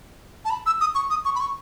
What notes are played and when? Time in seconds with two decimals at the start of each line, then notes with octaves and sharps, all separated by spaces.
0.45 A5
0.50 B5
0.66 E6
0.81 D#6
0.95 C#6
1.10 D#6
1.25 C#6
1.35 B5
1.40 C#6